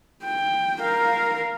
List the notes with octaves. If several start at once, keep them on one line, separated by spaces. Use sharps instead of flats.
G5
A#4 F5